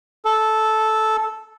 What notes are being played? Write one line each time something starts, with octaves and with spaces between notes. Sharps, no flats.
A4